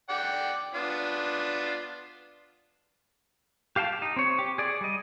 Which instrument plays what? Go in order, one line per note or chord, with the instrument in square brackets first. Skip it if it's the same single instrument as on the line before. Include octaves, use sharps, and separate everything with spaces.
[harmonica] D5 F#5 G5
B3 D4 F4
[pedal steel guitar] G4 F5 G5 A5
D#4
C4 C#5
G4
G#4 D5
G3 D#5